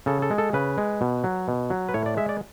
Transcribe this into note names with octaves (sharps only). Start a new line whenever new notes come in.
C#3 A4
A4
G#3
A4
C#3 B4
G#3
B2
F#3
B2
F#3
B4
A2 C#5
D5
G#3 E5
D5